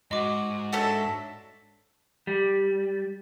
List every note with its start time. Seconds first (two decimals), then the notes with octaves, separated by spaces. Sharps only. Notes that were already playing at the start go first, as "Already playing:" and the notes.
0.11 G#2 F#4 D#5 C6 D6
0.73 D4 F#4 A4 C#5 E5
2.27 G3